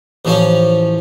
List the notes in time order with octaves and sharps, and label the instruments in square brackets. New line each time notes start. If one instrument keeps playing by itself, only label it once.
[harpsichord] A1 F3 C#4 F5